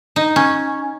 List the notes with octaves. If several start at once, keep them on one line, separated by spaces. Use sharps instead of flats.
D#4
C#4